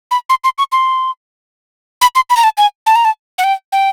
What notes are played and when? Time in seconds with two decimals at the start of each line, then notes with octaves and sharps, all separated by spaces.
0.11 B5
0.30 C6
0.44 C6
0.58 C#6
0.72 C6
2.01 B5
2.15 C6
2.30 B5
2.37 A#5
2.44 A5
2.58 G#5
2.86 A5
2.96 A#5
3.05 A5
3.38 F#5
3.44 G5
3.72 G5